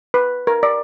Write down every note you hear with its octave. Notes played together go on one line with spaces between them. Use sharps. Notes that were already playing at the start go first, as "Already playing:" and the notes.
B4
A#4
D5